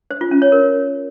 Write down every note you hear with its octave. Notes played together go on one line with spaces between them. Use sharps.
C5
F4
C#4
C#5
A#4